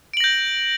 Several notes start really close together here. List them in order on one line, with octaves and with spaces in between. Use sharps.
D7 F#7 A#6 G6